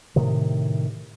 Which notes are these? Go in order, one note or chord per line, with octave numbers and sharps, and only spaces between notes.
A2 C3 D#3